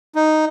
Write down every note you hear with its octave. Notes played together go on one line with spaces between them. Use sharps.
D#4